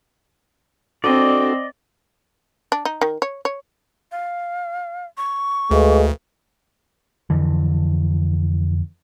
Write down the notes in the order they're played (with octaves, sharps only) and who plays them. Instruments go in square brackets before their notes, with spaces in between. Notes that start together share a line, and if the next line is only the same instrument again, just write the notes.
[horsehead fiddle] C4 [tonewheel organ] D4 F#4 A4 [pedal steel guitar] D5 D#5
[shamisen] D4
D#4
D#3
C#5
C#5
[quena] F5
C#6
[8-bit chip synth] D2 [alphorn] G#3 [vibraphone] A4 B4 F5
[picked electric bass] F2 D3 E3